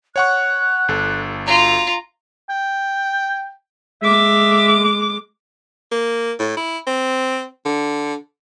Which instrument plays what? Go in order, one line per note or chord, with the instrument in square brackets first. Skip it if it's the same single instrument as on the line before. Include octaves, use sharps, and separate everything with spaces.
[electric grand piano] C#5 F#5 C#6 [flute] F#6
[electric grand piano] G1 A4
[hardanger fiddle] F4 A#5 [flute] F#4
[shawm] G5
[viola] G#3 D6 [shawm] E5
[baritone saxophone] A#3
A2
E4
C4
D3